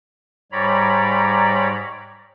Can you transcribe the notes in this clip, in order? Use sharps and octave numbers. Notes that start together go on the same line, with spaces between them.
G#2 G3 C#5 D5 A#5 B5